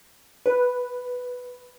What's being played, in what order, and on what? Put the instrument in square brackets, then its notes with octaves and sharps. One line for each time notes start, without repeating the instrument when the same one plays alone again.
[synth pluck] B4